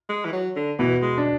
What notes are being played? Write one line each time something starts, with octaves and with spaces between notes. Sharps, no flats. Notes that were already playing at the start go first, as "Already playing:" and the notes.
G#3
E3
F#3
D3
B2 E3 B3
G#3
D4